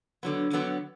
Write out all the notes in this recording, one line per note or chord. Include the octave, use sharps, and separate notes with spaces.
D3 F#3 B3
D3 F#3 B3